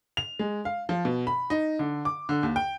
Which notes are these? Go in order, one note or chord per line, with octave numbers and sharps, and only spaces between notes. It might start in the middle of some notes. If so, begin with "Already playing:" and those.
F7
G#3
F5
F3
B2
B5
D#4
D3
D6
D3
D#2
G5